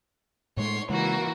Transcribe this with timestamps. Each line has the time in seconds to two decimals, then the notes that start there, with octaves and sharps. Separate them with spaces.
0.57 A2 G#3 A3 C#5 C6
0.90 C#3 E3 G#3 A#3 F#4